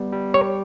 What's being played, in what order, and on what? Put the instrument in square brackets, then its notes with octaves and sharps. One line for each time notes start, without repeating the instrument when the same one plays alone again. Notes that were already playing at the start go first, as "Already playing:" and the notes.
Already playing: [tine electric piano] G3 B3
G3
[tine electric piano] G4 [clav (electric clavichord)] C#5